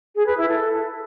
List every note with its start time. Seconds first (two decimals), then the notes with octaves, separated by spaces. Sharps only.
0.16 G#4
0.27 B4
0.38 E4
0.49 A4